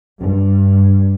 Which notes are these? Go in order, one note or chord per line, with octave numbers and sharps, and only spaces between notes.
G2